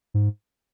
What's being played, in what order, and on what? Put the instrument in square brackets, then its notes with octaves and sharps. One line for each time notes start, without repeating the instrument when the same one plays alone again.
[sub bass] G#2